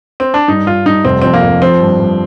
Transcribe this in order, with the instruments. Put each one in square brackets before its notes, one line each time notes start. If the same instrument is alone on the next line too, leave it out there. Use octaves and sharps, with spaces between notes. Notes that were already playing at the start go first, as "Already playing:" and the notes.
[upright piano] C4
D4
[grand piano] G2 [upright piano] D#4
[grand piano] G2 [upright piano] F4
[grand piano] G2 [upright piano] D#4
[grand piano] F1 [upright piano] C4
[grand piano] F2 [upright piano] C4
[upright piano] A#3
[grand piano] F2
[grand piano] F3 [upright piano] C4
[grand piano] G2
G2